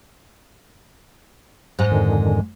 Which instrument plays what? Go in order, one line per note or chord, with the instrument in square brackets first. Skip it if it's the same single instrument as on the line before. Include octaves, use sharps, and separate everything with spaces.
[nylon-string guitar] G#2 G#3 [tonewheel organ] A#5 F#6
[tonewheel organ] F2 D3 D#3